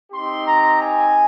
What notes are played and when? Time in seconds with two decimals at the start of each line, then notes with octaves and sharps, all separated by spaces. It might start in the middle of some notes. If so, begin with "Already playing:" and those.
0.12 C4 D#4 G4 C6
0.45 A#5
0.80 G#5